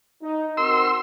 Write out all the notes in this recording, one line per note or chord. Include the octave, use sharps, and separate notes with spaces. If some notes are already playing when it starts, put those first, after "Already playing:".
D#4
C4 F#4 A#4 C6 E6